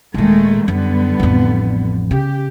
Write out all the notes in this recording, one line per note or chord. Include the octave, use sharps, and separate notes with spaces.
D#1 A#2 D#3 G#3 A3
F#2 D3 G3 B3
A1 F2
C#3 G4